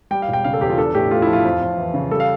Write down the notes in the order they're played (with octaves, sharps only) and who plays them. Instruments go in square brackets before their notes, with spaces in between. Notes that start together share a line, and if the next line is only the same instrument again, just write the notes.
[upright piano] G3 [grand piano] G5
[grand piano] F5
[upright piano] E1
[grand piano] G5
[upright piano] C#3 [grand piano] F5
[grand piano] A4
[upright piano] E2 [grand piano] G4
[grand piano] F4
[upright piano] D4 [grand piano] A4
[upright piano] A2 [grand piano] G4
[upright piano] A3 [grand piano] F4
[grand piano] E4
[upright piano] F3
[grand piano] F4
[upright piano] F2
F2
E3
C#3
[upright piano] G3 [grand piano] A4
[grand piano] F5